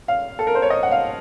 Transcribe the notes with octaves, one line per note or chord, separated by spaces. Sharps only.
F5
A4
A#4
C5
C#5
D#5
F#5
F5